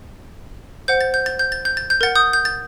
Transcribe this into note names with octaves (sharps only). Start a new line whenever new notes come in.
C5 F#5 G6
A6
G6
A6
G6
A6
G6
A6
G6
A#4 F#5 A6
D#6 G6
G6
A6